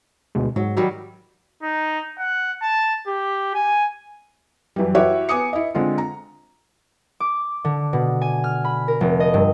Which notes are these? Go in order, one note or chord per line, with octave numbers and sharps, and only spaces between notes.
D2 B2 G#3
G#2 F#3
D#3 F#3 G3
D#4
F#5
A5
G4
G#5
F#2 E3 G3
E4 F#4 G4 B4 C#5 E5
B3 G#5 D6 D#6 C#7
E4 D#5
D3 G#3 C4 F4
A#5
D6
D3
B2
G#5
F6
B5
A#4
F1
D#5
G2